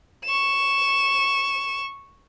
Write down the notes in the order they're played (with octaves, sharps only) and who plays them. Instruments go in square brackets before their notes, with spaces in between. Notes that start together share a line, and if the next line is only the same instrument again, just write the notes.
[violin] C#6 E7